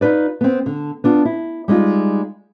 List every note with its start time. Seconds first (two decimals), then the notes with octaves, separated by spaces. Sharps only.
0.01 D#4 F4 B4 D5
0.41 B3 C4
0.66 D3
1.04 B3 D4 F4
1.25 E4
1.68 G3 G#3 D#4 F4